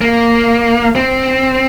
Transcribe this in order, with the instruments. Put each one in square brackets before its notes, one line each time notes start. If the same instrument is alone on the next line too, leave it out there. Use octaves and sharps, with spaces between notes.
[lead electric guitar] A#3
C4